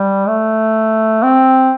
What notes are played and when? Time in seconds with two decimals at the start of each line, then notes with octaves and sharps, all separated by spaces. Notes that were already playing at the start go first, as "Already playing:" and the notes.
Already playing: G3
0.28 A3
1.23 C4